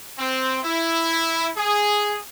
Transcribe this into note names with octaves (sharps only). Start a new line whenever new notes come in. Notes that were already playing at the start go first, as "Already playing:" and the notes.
C4
E4
G#4